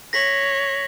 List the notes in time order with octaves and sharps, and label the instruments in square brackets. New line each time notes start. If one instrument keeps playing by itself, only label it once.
[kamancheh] C#5 [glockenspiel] A#6 B6 F#7